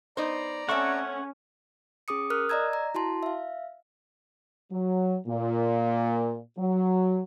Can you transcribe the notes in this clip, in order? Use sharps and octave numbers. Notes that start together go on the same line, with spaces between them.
B3 D#4 C5 D5 A#5
A3 C4 C#4 E5 F#5 C#6
C#4 G#4 D6 D#6 C#7
A#4 D#6 F6 F#6
D5 D#5 A#5 E6 G#6
A#5
E4 F#4 A5 C6
E5 F5
F#3
A#2
F#3